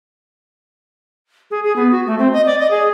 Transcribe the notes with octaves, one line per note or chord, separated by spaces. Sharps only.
G#4
G#4
B3
F#4
A3
C4
D#5
D5
D#5
G#4